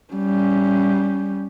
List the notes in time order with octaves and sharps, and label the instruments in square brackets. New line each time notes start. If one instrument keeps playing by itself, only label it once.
[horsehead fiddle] G3 C#4